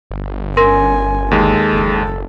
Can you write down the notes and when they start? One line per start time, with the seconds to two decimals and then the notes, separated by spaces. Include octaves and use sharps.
0.11 G1
0.57 C#4 A#4 G#5 C6 A#6
1.31 D#2 G#3 A4
1.73 F#1